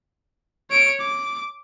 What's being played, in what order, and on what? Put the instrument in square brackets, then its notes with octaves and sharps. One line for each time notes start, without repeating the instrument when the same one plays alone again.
[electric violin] C#5 D7
D6